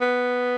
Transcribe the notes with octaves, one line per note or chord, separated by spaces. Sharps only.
B3